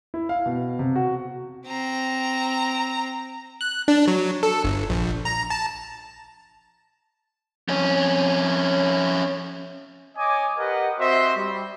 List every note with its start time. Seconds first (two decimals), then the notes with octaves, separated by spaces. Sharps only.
0.14 E4
0.29 F5
0.46 B2
0.79 C3
0.96 F#4
1.67 C4 A#5
3.61 F#6
3.88 D4
4.07 F#3
4.43 A4
4.64 G1
4.90 A#1
5.25 A#5
5.50 A5
7.68 F2 C#4
10.18 C#5 D#5 G#5 D6
10.58 G4 A#4 B4 D#5 F#5
10.99 C4 F#4 C5 D#5 E5 C6
11.37 G3